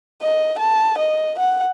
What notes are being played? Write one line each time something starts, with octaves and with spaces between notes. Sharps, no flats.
D#5
A5
D#5
F#5